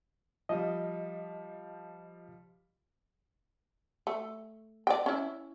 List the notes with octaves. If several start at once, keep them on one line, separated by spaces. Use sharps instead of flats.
F3 G3 D#5
A3
D5 G5
C#4 E4